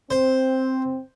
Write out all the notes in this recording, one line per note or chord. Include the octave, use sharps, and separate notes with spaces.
C4 C5